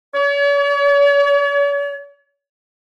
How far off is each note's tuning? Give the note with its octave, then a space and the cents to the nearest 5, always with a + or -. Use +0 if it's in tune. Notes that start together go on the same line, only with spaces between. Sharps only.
C#5 +45